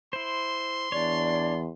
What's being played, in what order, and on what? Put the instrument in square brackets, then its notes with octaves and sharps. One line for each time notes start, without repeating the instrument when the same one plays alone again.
[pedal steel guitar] E4 C5 [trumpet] C6
[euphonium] E2 [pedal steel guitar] D4 C#5 [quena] D5